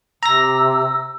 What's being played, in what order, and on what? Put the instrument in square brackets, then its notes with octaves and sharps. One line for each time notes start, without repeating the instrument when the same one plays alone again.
[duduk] C3 [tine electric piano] A#5 A#6 [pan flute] E6